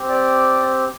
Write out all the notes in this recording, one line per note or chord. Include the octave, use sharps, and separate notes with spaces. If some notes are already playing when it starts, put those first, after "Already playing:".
Already playing: C4 G4
D5